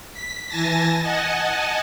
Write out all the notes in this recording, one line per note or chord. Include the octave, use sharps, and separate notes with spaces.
B6
E3 G#5 A5 A6 A#6
D#5 F#5 G#5 A5